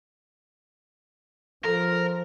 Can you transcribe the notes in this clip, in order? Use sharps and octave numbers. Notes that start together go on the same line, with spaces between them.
F3 A4 A#4